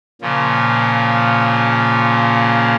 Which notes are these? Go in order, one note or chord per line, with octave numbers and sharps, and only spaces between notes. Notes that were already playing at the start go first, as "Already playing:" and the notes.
A#2 C#3 F3